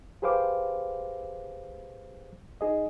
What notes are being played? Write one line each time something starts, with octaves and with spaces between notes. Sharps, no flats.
G4 G#4 B4 C5 F5 D6
D#4 G#4 D#5